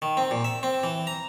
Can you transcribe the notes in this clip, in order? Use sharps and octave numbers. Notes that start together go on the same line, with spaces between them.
D#3
C4
A#2
E5
C4
E3
A#5